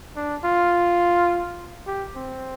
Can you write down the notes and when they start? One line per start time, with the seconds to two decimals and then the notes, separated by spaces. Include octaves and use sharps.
0.16 D4
0.45 F4
1.87 G4
2.16 C4